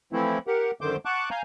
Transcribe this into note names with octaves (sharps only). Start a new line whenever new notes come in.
E3 F3 A3 C4 E4
G4 A#4 F#5
F#2 D3 D#3 C5 D6 G6
F#5 A5 C#6 D6 F#6
F5 G#5 A#5 G6